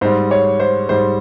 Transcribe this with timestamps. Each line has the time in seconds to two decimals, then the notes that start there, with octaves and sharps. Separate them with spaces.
0.01 G#2 G3 C5
0.31 C#5
0.60 C5
0.89 G#2 G3 C5